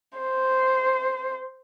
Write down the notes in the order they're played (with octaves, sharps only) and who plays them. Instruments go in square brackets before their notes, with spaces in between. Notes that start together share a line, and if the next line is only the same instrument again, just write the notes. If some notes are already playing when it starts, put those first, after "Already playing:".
[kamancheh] C5